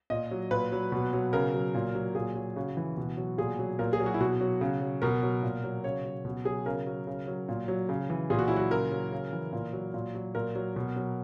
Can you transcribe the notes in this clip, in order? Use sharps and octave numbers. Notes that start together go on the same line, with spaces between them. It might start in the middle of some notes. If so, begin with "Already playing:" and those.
A#2 D#5
F#3
A#2 B4
F#3
B2
F#3
C#3 A#4
F#3
A#2
F#3
A#2 G#4
F#3
C#3 F#4
E3
B2
F#3
A#2 G#4
F#3
A#2 A#4
G#4
F#3
F#4
E4
B2 F#4
F#3
C#3
F#3
B2 A#4
F#3
A#2
F#3
C#3 C#5
F#3
B2
F#3 G#4
C#3 A#4
F#3
C#3
F#3
A#2
F#3
C#3
E3
A#2 G#4
F#4
F#3 E4
F#4
C#3 A#4
F#3
C#3
E3
A#2
F#3
A#2
F#3
A#2 A#4
F#3
B2
F#3